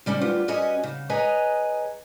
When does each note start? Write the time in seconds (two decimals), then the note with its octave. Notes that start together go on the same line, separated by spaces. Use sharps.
0.06 C#3 G3 C#4 G4
0.21 D2 F4 G4 B4
0.48 C#4 F#4 G#4 B4 C#5 D#5
0.83 C#3
1.09 G#4 B4 C#5 D#5 G#5 A#5